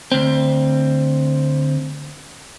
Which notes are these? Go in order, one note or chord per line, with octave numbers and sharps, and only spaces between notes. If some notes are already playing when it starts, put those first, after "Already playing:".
D2 C4